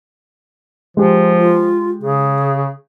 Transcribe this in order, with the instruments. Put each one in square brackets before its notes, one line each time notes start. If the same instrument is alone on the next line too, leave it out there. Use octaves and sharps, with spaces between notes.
[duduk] F3 [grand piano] G#3 G4
[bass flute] F4
[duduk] C#3 [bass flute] G#4